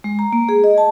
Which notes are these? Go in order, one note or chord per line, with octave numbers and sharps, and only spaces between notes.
G#3
A#5
A#3
G#4
D#5
A5